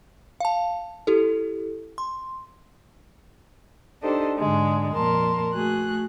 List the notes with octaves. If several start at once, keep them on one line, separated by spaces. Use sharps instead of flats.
F5 A5
E4 G4 A4
C6
D4 D#4 G4 A4 C5 D#5
G#2 D3 G#3
F2 A#2 A#4 A5 C6
A3 F#4 G#4 F#6